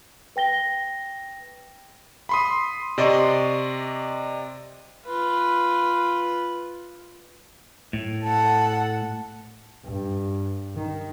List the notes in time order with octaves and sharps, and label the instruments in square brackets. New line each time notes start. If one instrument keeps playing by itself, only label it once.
[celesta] B4 G5 A#6 G7
[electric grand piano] B5 C6 D#6
C3 D5 D#5 C6 C#6
[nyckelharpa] F4 B4
[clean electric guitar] A2
[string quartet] A4 F#5
[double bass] G2
D#3